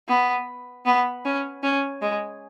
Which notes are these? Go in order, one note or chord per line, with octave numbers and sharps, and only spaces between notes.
B3
B3
C#4
C#4
G#3